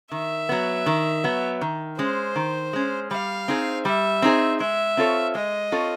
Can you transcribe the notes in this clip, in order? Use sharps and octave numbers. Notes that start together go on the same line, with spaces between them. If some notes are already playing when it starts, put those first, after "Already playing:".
D#3 E5
F#3 B3
D#3
F#3 B3
D#3
G#3 C#4 C5
D#3
G#3 C#4
G3 F5
C4 D#4 G#4 C5
G3 E5
C4 D#4 G#4 C5
G#3 E5
C4 F4 A4 C#5
G#3 D#5
C4 F4 A4 C#5